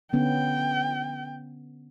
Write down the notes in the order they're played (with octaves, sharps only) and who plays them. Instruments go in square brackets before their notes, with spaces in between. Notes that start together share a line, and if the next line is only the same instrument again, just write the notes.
[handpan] D3 B3 C#4 [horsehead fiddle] G5